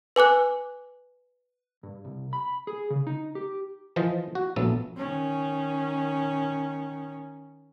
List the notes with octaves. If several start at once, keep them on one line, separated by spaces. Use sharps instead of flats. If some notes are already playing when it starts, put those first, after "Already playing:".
B4 G#5 D6 F#6
G2
C2
B5
G#4
C#3
D#4
G4
E3 F3 F4 C5 D#5
F#4
A#1 F#3 A3 B3 A4
D#3 C#4